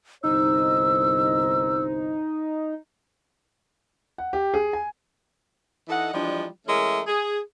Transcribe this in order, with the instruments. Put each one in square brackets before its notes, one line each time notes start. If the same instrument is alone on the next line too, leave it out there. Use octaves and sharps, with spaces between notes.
[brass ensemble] G1 C2 C5 [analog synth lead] D#4 [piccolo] E6
[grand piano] F#5
G4
G#4
G#5
[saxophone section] E3 D#4 A4 D#5 F#5
E3 F3 G3 G#3 D4
E3 G#3 A3 C#4 A#4 E5
G#4